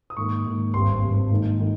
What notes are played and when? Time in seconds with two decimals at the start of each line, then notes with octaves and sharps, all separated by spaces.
0.10 D#6
0.17 G#2 D#3 A#3 C#6
0.46 G#2 D#3 A#3
0.74 G#1 G2 G3 C4 C6
1.02 G#1 G2 G3 C4
1.31 G#2 D#3 A#3
1.60 D#3